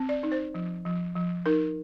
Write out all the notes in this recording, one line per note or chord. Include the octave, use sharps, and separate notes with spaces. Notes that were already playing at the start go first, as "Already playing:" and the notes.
Already playing: C4
D5
D#4
C5
F3
F3
F3
D#4 A#4